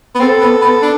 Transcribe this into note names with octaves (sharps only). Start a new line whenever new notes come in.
B3
C4 A4
B3
B3
D4